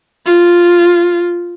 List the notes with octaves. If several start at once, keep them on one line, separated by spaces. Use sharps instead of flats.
F4